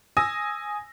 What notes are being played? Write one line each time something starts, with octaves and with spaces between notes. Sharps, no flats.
G#5 D#6 E6 A#6